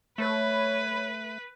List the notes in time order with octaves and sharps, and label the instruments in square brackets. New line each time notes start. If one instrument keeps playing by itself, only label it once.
[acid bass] A3 [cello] B4 [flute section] C#5 B5